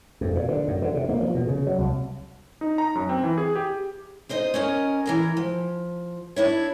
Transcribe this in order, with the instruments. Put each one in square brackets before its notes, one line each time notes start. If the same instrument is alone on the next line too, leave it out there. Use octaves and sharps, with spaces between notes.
[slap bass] F2
A#2
D3
F#2
D3
C3
A#3
F3
B2
C#3
F#3
C2
[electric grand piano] D#4
A#5
F#2
C4
E3
G#4
G4
[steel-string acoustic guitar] D#4 C5 D#5
C#4 A#4 D#5
E3 A#4 A#5
F3
D4 E4 C#5